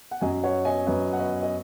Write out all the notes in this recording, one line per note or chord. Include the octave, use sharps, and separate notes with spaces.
F#5
F#2 F#3 C#4 D#5 G#5
C#5 F#5
D#5 G#5
F#2 F#3 C#4 B4 D#5
F#5
B4 D#5
D#5